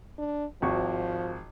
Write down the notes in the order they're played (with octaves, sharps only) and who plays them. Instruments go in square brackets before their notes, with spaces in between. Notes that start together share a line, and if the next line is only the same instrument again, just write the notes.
[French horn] D4
[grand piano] G#1 F#4 C#6 [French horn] F3